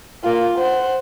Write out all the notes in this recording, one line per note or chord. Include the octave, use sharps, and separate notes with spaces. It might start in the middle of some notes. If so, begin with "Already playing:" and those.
A#3 F4
C5 F#5